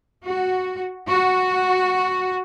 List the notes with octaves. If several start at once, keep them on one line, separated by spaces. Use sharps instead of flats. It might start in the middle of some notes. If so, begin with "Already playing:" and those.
F#4
F#4